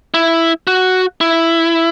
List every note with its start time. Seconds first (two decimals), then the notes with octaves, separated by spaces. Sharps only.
0.14 E4
0.67 F#4
1.21 E4